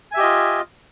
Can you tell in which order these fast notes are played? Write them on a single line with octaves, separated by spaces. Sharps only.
G#5 E5 G4 D#5 F4